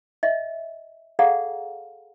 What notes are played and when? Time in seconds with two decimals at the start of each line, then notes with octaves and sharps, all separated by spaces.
0.23 D#5 E5
1.19 G#4 A4 D5 F5 F#5 A#5